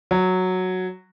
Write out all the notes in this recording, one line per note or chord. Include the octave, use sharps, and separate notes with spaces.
F#3